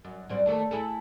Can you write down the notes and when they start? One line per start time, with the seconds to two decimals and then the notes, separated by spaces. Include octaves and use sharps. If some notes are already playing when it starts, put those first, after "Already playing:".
0.05 F#2
0.29 F#2 G3 C4
0.46 D#2 A3 A4
0.71 E4 G#4 A4